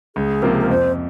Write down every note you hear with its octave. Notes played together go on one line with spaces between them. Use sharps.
C#2 G#4
C3 F3 A#3 A#4
G#4
A#4
F2 C5